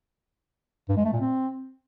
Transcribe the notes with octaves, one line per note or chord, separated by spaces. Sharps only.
G2
G#3
A3
A#2
C4